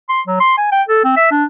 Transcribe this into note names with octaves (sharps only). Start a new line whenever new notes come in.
C6
F#3
C6
G#5
G5
A4
C4
E5
D4